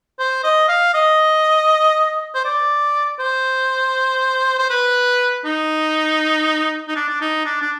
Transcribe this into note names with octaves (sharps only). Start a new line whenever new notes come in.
C5
D#5
F5
D#5
C5
D5
C5
C5
B4
D#4
D#4
D4
D4
D#4
D4
D4